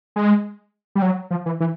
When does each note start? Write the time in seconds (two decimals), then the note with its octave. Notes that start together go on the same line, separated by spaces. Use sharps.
0.16 G#3
0.95 G3
1.02 F#3
1.31 F3
1.46 E3
1.60 E3